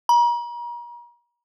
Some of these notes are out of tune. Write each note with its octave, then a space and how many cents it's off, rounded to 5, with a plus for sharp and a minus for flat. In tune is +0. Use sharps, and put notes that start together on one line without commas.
A#5 +40